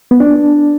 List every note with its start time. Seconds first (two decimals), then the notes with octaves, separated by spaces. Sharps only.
0.11 B3
0.20 D4